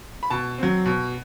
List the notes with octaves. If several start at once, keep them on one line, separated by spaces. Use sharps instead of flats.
B5
B2 A5
F#3 C4
B2